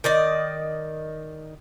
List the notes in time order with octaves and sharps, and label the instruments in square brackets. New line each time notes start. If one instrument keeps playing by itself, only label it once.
[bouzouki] D#3 D5 D#5